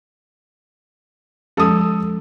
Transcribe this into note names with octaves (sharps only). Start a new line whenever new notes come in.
F3 G#3 C#4 A4 D#6